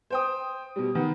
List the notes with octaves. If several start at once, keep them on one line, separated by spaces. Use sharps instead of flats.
C5 G5 D#6
B2 G3
D#3 B3